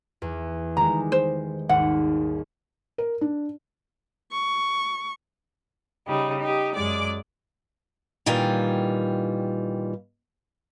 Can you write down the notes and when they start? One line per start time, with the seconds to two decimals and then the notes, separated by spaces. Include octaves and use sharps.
0.22 E2
0.77 D#3 G3 G#3 A#5
1.12 C5
1.69 G#1 D#2 F#5
2.98 A#4
3.21 D4
4.32 C#6
6.07 C#3 G3 D#4
6.39 D#4 G4
6.75 F#2 G#3 D5 D6
8.26 A#2 D#3 E3 G3 F4